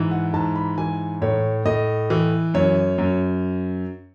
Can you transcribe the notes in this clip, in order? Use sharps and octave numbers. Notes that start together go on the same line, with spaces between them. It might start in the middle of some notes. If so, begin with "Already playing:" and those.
Already playing: G#2 E3
F#5
G#2 A5
B5
E3 G#5
A2 C#5
A2 D#5
E3
F#2 C#5
F#2